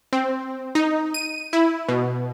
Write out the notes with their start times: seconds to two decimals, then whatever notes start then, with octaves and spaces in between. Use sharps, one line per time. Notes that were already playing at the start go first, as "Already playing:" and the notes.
0.13 C4
0.75 D#4
1.14 D#7
1.53 E4
1.88 B2